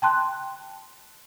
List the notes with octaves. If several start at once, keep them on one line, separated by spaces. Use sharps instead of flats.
G5 A5 C6 F#6